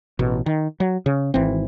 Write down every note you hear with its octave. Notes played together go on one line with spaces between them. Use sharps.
A1 B2
D#3
F#3
C#3
G#1 E3 C4